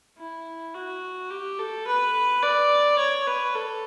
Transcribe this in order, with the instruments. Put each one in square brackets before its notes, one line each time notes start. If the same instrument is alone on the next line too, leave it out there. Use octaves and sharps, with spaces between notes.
[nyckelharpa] E4
F#4
G4
A4
B4
D5
C#5
B4
A4